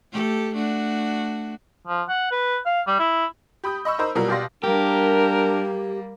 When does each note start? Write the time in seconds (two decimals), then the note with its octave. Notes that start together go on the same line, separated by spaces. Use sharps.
0.11 A3 G4 A4
0.54 A3 D4 F#4
1.87 F3
2.09 F#5
2.32 B4
2.66 F5
2.87 G3
2.99 E4
3.64 G4 B5 D#6 G6
3.85 D#5 B5 C#6 E6
3.99 D#4 A#4 C5 B5
4.15 B2 F#3 G3 A#3 F4 A#4
4.28 B2 G4 D5 F5 C6 A#6
4.64 G3 A#3 D4 G4 A#4